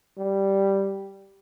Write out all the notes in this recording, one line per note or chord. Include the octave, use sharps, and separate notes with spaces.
G3